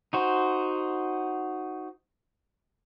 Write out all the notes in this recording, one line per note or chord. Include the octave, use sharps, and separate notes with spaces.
D#4 F#4 C5